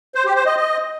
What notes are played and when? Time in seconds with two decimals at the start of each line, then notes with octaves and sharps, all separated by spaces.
0.15 C5
0.25 G4
0.36 C5
0.46 D#5
0.57 D#5